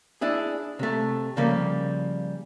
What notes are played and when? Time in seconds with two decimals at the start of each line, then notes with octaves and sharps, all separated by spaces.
0.21 D4 E4 G#4
0.79 C3 A3
1.37 C#3 F3 G3 A#3